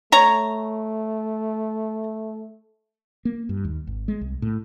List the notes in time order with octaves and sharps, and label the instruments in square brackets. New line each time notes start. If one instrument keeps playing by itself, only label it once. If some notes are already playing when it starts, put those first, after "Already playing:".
[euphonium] A3 [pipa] C#5 A#5
[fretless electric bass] A#3
G2
D#2
G#1
G#3
C2
A2